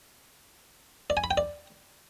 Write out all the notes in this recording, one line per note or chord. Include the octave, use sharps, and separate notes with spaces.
D5
G#5
B5
G5
D5